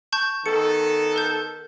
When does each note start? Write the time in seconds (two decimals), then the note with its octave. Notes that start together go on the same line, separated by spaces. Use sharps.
0.13 A5 C#6 G6
0.46 D#3 B3 A4 C#7
1.16 A#4 G6